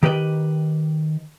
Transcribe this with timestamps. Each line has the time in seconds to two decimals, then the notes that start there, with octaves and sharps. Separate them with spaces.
0.03 D#3 G4 B4 D#5